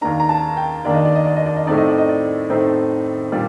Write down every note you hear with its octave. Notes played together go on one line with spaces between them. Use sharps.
D#2 D#3 A#3 D4 A#5
A#5
A5
G5
D#2 D#3 A#3 D4 D5
D#5
D5
D#5
D5
D#5
D5
D#5
A2 A3 C4 D#4 D5
D#5
D5
D#5
D5
A2 A3 C4 D#4 C5
A#2 G3 D4 D5